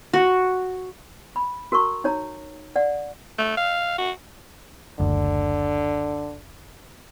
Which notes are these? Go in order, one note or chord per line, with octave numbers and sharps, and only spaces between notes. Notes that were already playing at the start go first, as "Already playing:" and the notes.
F#4
B5
F#4 A#4 A#5 C#6
D#4 C#5 A#5
D5 F#5
A3
F5
F#4
F#1 D2 D3